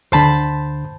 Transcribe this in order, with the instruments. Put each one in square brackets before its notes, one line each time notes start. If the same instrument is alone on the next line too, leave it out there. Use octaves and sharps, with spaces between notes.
[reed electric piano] D2 D3 [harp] C5 A5 B5